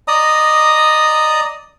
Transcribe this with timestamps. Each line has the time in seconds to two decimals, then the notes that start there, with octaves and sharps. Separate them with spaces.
0.08 D5 D#5 A#5 D#6